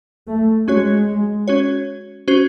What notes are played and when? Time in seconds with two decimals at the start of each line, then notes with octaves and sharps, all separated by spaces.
0.28 A3
0.68 G#3 C#4 F#4 C#5
1.48 C#4 F#4 C#5
2.28 C#4 F#4 C5